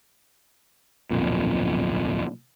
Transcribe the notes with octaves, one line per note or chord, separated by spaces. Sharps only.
D1 B1 F2 A#2